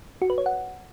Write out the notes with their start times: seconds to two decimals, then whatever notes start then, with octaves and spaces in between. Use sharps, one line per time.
0.22 F#4
0.30 B4
0.38 C#5
0.46 F#5